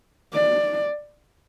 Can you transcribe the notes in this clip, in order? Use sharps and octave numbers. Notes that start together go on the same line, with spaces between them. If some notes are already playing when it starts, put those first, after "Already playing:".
D5